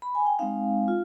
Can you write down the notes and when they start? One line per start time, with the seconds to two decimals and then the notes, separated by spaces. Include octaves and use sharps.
0.02 B5
0.15 G#5
0.26 G5
0.39 G#3 C4 D#4 F5
0.88 F4